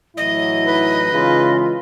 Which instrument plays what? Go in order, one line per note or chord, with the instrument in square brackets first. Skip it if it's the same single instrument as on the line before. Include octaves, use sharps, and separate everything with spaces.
[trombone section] A2 E3 F#3 [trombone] E4 [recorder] D#5
[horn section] D#4 B4
[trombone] C#3 [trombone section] E3 G#3 F4